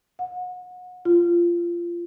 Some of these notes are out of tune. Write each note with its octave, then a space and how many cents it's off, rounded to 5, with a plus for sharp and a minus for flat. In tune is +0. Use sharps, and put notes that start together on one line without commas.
F#5 -30
F4 -20